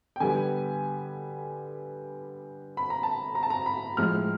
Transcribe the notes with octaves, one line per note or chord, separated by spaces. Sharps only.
G5
D3 G3 B3 G#5
B5
A#5
A5
A#5
A5
A#5
B5
A2 F3 G#3 F6